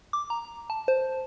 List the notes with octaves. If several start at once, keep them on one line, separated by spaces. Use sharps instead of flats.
D6
A#5
A5
C5